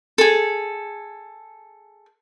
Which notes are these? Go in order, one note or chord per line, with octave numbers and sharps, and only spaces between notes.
G#4 A4